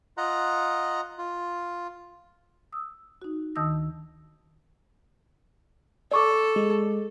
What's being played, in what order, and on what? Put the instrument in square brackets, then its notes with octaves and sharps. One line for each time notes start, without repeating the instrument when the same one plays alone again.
[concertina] F4 D#5 F#5 A#5
F4
[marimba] D#6 E6
D#4 F#4
D2 D#3 A5 D#6 E6 A#6
[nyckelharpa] A4 [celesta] D5 C#6 D6
[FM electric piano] G#3